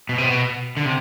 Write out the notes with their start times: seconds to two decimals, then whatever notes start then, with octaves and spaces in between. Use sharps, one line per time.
0.09 B2
0.18 C3
0.26 B2
0.77 D3
0.85 C3